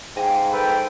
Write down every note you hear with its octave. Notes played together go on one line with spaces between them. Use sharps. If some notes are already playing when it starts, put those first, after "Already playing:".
G#2 G4 F5 G#5 A#5
A4 B4 G5